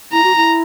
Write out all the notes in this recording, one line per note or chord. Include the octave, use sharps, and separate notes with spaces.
E4 A#5
F#4
E4